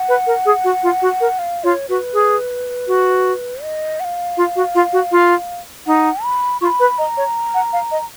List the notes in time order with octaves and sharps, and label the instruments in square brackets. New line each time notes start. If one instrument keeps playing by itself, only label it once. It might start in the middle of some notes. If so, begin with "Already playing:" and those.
Already playing: [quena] F#5
[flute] B4
A#4
G#4
F#4
F4
F#4
A#4
[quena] F5
[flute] F4 [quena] C#5
[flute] F#4 [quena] B4
[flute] G#4
F#4
[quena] D#5
F#5
F5
[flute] F4
F#4
F4
F#4
F4
[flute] D#4 [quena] F#5
[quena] B5
[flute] F4 [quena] C#6
[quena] B5
[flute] B4
[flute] D#5 [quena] A#5
[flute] C#5
F#5
F5
D#5